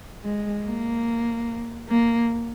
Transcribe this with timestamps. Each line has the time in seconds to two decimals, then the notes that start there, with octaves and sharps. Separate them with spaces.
0.25 G#3
0.66 A#3
1.89 A#3